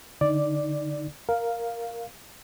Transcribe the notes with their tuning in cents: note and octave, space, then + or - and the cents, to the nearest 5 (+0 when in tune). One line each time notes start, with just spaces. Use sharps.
D3 +0 D#4 +0 D5 +0
A#4 +0 F5 +0